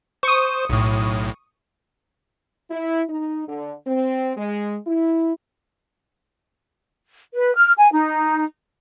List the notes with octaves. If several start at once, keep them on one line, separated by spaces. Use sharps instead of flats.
C5 C#6 D#6
B1 A2
E4
D#4
D3
C4
G#3
E4
B4
F6
G#5
D#4